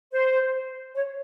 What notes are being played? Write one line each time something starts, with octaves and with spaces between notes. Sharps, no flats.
C5
C#5